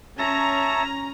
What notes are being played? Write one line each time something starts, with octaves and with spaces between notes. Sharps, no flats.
C#4 C#5 E5 A5 A#5